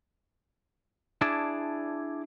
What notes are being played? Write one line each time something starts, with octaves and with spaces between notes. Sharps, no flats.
D4 E4 G#4 D5 A5